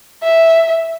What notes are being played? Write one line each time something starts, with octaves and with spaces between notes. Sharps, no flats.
E5